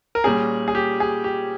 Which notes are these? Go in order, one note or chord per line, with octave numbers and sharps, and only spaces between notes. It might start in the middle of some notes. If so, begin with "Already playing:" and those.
A#4
A#2 G3 C#4 G#4
G#4
G4
G#4
G4